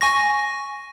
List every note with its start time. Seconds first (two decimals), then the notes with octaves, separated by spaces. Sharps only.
0.01 G#5 C#6 A#6